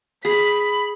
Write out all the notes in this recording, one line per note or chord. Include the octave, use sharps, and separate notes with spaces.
G#4 B5 B6